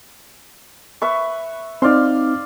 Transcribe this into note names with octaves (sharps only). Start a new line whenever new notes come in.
B4 E5 C#6
C4 D#4 D5 F5 C6